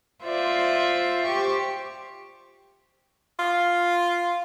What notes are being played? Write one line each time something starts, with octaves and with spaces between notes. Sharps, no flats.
F4 C5 D5 E5
G4 C5 C#6
F4